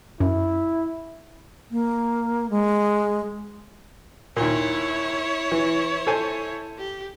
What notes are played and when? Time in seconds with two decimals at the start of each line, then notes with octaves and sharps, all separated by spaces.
0.20 F#2 E4
1.71 A#3
2.50 G#3
4.37 D#2 A#2 E4 C#5
5.52 E3
6.07 A4 C5 G#5
6.78 G4